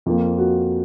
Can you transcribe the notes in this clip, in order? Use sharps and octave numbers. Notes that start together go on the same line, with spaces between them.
F2 F3 A#3
F#4